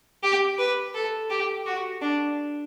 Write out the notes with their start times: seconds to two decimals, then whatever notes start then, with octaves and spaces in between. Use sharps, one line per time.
0.23 G4
0.59 B4
0.95 A4
1.30 G4
1.66 F#4
2.02 D4